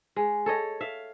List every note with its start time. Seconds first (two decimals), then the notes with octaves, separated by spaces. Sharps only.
0.16 G#3
0.46 A4 C#5 D#5
0.81 E5 F5